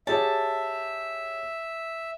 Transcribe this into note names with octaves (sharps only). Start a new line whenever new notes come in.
G4 G#4 C#5 E5 A5